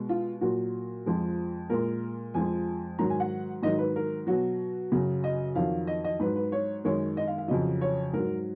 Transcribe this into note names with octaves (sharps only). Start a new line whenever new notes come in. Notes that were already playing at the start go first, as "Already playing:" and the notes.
Already playing: B2 G#3
F4
A#2 F#3 F#4
F2 F3 G#3
A#2 G#3 A#4
F2 F3 G#3 G#5
G#2 D#3 F#3 A#5
G#5
F#5
G#2 D#3 F#3 D#5
B4
A#4
B2 F#3 F#4
F#2 C#3 F#3
D#5
F2 D#3 F#3 F5
D#5
D#5
G#2 F#3 B4
B4
C#5
F#2 D#3 G#3 C#5
D#5
F5
F5
F2 C#3 F#3 D#5
C#5
G#2 F#3 A#4